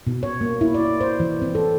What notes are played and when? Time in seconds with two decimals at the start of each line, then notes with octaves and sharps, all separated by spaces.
0.07 B2
0.23 C#5
0.41 A#3
0.61 E4
0.74 D5
1.01 C5
1.20 E3
1.42 C4
1.55 A4